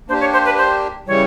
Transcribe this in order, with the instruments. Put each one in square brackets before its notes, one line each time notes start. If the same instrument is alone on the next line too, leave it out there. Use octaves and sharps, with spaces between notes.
[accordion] A#3 D4 G4 [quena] C5
[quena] C#5
C5
B4
C5
[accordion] C#3 E3 G3 [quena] C#5